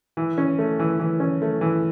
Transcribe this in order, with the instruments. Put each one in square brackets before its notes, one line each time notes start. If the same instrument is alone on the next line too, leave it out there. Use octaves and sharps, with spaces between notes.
[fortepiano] E3
C#4
A3
E3
E3
C#4
A3
E3